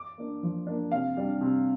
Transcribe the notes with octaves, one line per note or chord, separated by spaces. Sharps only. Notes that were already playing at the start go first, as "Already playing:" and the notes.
Already playing: D6
A#3 D4
F3
A#3 D4
C3 F5
G3 D4
C3